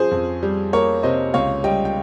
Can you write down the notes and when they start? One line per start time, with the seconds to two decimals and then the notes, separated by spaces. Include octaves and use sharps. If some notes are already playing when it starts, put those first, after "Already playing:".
Already playing: F3 C#4 G#4 C5
0.11 F2
0.43 G3
0.73 A#3 A#4 C#5
1.03 C3 C5 D#5
1.34 C#2 C#5 F5
1.64 G3 D#5 G5
1.85 G5